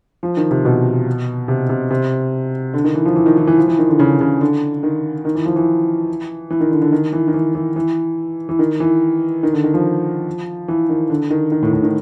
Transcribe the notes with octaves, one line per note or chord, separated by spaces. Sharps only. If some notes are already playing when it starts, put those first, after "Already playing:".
F3
D#3
C3
B2
C3
C3
C3
D3
D#3
E3
F3
E3
D#3
E3
E3
F3
E3
D#3
D3
C#3
C#3
D3
D#3
D#3
E3
F3
E3
E3
D#3
D3
D3
D#3
E3
D#3
E3
E3
E3
E3
D#3
E3
D#3
D3
D#3
F3
E3
D#3
D3
D#3
D#3
A2
A2
D#3